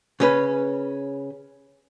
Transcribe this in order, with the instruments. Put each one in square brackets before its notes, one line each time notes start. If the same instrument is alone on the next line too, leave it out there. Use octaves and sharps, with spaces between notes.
[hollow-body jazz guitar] C#3 C#4 B4